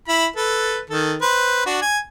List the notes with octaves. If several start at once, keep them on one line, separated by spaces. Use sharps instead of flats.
E4 B5
A4 B4
D#3 A4
B4 C5
D4 F#4
G#5